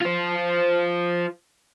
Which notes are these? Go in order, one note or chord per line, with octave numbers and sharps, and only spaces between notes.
F4 C5